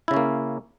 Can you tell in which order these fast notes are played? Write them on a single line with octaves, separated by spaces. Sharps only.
E4 C#3 C#4 A#3